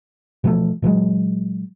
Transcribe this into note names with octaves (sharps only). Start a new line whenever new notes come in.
B2 E3 F3 A3
A#2 E3 F#3 G#3